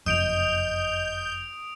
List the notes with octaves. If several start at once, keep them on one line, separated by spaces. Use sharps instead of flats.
F#1 F2 D#5 D#6 G6 D7 F7